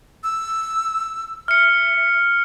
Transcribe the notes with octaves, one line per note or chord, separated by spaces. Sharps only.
E6
E5 F6 C#7